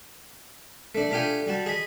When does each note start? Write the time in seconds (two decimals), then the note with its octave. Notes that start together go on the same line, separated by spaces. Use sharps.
0.95 A3 D4
1.11 A3 D4 F4 G4 G5 G#5
1.47 G3 F#4 A5
1.66 G#4 D#5 B5